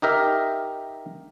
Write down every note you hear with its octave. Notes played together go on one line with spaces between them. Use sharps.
D#4 G4 A#4 E5